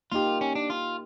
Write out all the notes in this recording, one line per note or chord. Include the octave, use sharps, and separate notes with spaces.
A#3 D#4 F4 G4
C#4
D4
F4